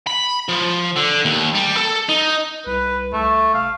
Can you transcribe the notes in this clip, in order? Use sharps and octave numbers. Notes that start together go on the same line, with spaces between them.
B5
F3
D3
D#2
G3
A4
D#4
C2 B4
C2 A3
F1 F5